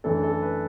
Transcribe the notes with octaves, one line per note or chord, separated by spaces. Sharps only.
F#2 E3 A3 D4 A4
A4
B4